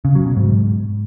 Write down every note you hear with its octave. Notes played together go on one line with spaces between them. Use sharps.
C#3
F#3
B2
G#2